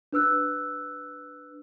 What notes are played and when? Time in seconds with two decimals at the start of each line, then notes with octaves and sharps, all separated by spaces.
0.12 D4 B4 E6 F#6